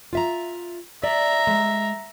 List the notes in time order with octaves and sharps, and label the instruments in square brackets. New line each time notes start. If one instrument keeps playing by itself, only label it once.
[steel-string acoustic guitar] F4 E5 A#5
[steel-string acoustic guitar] D5 [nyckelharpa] E5 A#5
[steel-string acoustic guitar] G#3